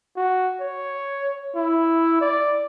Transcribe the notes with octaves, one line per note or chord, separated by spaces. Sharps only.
F#4
C#5
E4
D5